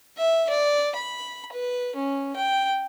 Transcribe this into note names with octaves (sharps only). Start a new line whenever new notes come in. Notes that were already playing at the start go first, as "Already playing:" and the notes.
E5
D5
B5
B4
C#4
G5